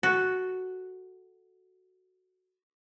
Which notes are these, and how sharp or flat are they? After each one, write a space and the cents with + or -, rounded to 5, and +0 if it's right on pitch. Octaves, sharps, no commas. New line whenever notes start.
F#4 +0 A4 +0